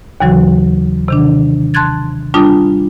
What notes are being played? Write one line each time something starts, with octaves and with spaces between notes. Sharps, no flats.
D#2 C#3 E3 F#3 F#4
C3 D#3 D4
A5 C6 F#6 G#6 A6
G3 D4 F4 A5 D#6